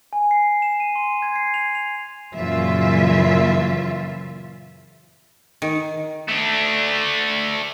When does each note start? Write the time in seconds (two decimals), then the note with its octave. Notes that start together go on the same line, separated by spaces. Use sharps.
0.13 G#5
0.31 C7
0.62 E7
0.80 D#7
0.96 C6
1.22 G#6
1.36 C7
1.54 F7
1.75 F7
2.34 F#2 A#2 C#3 E3 F4 E5
5.62 D#3
6.29 A3 D4